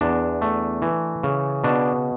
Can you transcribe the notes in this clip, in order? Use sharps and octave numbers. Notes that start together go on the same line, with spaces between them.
E2 D4
A3
E3
C#3
B2 D4